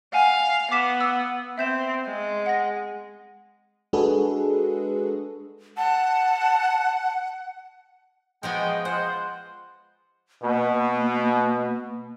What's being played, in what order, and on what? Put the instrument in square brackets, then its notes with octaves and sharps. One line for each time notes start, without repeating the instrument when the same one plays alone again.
[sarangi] F5 [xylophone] F#5 G#5
[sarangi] B3 [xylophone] D6 B6 E7
[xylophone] E6
[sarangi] C4 [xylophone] E5 G6 E7
[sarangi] G#3
[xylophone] F#5 A#6
[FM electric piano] G#3 D4 F#4 G#4 A4 B4
[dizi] F#5 [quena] A5
[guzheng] F3 B3 F#4 [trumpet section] G#3 G5
[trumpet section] G#3 F4 C5 [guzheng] F#5
[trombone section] B2 [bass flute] A#3